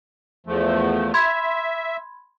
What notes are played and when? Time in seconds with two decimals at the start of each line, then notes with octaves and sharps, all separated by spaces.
0.46 E2 F3 A3
1.14 E5 B5 C6 G#6